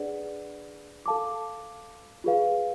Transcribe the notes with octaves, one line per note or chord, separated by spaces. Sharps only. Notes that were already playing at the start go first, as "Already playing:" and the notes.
Already playing: D4 G#4 B4 D5 F#5
A4 F5 A5 D6
F4 G#4 B4 F5